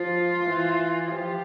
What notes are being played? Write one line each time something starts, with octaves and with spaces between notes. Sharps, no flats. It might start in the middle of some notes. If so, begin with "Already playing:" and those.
Already playing: F3 F4
E3
F3 G4